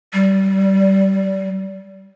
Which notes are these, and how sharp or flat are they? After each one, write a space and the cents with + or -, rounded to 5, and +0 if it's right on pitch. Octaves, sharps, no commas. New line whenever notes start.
G3 -25